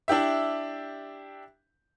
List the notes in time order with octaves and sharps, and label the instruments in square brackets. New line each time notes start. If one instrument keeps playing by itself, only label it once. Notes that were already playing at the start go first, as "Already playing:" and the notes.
[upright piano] D4 E4 G4 E5